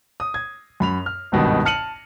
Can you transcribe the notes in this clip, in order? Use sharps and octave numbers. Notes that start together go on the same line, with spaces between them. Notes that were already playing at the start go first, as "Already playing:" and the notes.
D#6
G#6
F#2 B5 F7
F6
G#1 C#2 G2 B2 D#3
A5 F6 C#7 D#7 F#7